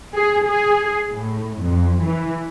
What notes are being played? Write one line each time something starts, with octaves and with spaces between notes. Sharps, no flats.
G#4
G#4
A2
F2
E3